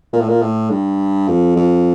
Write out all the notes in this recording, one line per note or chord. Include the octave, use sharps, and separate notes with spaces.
A#2
A2
A#2
A2
G2
F2
F2